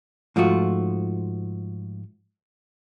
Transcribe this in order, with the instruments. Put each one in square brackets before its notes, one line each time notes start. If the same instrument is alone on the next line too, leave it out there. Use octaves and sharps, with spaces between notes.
[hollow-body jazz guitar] G#2 F3 A3 F4 F#4